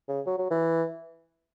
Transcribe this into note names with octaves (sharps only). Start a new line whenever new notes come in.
C#3
F#3
F#3
E3